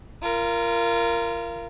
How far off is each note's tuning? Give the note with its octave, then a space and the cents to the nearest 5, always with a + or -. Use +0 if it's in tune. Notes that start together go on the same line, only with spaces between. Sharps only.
F4 -30 A#4 +0